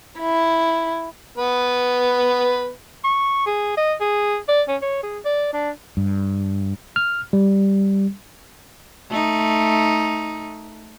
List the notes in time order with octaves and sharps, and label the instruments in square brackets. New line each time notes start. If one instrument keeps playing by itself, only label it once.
[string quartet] E4
[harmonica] B3 B4
[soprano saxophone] C#6
G#4
D#5
G#4
D5
C#4
C#5
G#4
D5
D4
[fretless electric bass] G2
[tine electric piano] F6
G3
[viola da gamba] A3 D#4